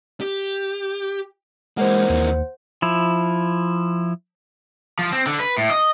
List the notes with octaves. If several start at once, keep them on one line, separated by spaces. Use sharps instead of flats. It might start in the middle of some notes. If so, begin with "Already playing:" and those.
G4
E3 G#3 A#3 C5 F#5
D#2
F3 E4
F3
C4
D3
B4
A2
D#5